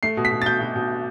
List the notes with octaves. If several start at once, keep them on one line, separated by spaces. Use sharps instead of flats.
A3 C7
B2
B6
B2
A6
B2 G6
B2
B2